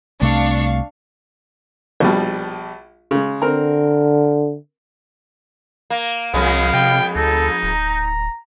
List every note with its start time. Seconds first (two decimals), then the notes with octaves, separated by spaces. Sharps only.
0.21 C2 C3 A3 D4 F5 C#6
2.00 A#1 B2 G3
3.11 C#3 G#3
3.42 D3 C4 A#4
5.90 A#3
6.34 C2 F2 G#3 B3 F5
6.73 C3 G5
7.15 D2 D#4 A4
7.63 D1 A#5